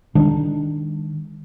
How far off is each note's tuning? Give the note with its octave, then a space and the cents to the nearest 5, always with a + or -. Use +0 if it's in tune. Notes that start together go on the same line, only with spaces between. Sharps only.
D#3 -5 G#3 -40 D4 +0